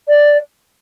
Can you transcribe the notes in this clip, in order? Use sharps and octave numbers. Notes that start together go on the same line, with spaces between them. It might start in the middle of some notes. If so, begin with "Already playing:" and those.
D5